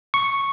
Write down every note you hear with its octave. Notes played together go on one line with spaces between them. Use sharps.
C#6